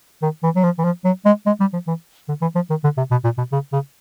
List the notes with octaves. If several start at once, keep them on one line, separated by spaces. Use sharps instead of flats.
D#3
E3
F#3
F3
E3
F3
F#3
G#3
G#3
G3
F3
E3
D3
E3
F3
D#3
D3
C3
B2
A#2
B2
C#3
C#3